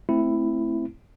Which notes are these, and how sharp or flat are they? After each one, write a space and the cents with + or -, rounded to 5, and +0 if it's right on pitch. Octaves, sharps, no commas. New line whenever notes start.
A3 +0 C4 +0 E4 +5